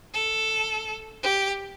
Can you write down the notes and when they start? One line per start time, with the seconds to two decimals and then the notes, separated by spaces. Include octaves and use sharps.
0.14 A4
1.23 G4